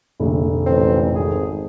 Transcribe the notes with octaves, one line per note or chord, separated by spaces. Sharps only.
F1 A#1 D3
A1 C4
G#1 G#4